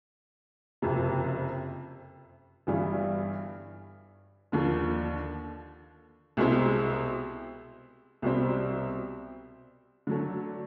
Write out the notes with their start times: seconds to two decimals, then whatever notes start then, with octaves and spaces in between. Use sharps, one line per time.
0.82 F#1 F2 C3
2.67 G1 G2 E3 G3
4.52 D#2 D3 F3
6.37 C2 B2 G#3 C4 E4
8.22 C2 B2 G3 C4
10.07 D3 F#3 A3